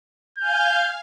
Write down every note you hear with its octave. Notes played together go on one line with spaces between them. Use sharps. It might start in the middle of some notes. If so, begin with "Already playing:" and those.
F5 G#5 F6 G6